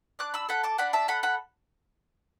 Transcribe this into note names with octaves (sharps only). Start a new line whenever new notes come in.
D4 D6 F#6
B5 E6
A4 F#5 B5
A5 D6
D4 F#5 B5
E5 A5
A4 F#5 B5
F#5 B5